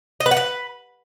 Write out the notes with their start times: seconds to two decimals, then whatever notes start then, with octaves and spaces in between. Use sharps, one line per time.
0.20 D#5
0.26 B4
0.31 F#5
0.37 B4